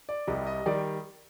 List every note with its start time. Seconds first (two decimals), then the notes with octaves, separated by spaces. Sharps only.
0.09 D5
0.27 C2 C3 G3 D#5
0.47 D#5
0.66 D#3 G3 D5